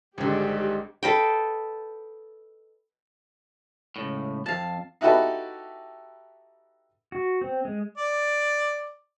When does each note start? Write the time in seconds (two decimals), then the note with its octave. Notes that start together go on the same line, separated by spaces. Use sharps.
0.18 G#1 G#2 D3 G3 G#3 G4
1.03 A4 B4 D#5 G5
3.96 C#2 A2
4.46 F2 F5 A5
5.01 D#4 E4 F#4 G4 A4 B4
7.12 F#4
7.41 C4
7.65 G#3
7.98 D5